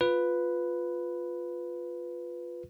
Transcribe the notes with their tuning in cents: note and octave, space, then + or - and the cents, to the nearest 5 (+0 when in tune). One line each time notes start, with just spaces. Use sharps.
F4 +10 B4 +5